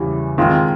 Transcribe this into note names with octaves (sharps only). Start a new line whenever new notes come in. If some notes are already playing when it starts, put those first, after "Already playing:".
Already playing: E2 C#3 E3 G3
D#3 G#3 C4 F4